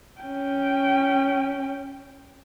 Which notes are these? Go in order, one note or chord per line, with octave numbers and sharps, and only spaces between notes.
C#4 G5